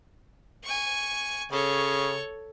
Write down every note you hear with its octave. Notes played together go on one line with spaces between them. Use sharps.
G#5 C#6
C#3 A4 C#5